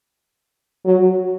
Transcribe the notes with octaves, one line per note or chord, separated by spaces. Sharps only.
F#3